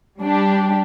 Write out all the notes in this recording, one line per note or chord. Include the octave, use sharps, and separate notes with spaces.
G3 D4 G4